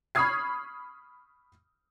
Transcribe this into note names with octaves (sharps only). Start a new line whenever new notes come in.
B5 C#6 D#6 F6 G#6 C7